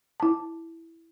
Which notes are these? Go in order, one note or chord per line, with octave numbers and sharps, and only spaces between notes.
E4 A5